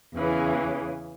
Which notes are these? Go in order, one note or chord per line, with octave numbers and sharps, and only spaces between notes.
E2 C#3 E3 C#4